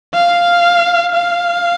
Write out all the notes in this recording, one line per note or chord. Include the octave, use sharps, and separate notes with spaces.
F5
F5